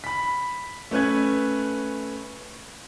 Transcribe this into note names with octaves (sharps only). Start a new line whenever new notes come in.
B5 B6
A3 C#4 B4 F#6 G#6